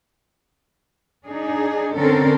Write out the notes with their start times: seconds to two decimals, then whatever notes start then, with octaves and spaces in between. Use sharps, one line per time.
1.29 D4 D#4 G#4
1.96 D3 C4 C#4 A4 A#4